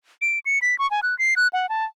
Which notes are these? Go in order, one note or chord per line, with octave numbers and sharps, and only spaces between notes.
D7
C#7
B6
C#6
G#5
F#6
C7
F#6
F#5
A5